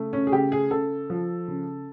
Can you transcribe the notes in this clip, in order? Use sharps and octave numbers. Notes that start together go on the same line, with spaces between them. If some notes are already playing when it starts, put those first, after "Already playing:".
Already playing: C#3 A3
C#4
G#4
C#3 G4
G#4
C#3 A4
F3
C#3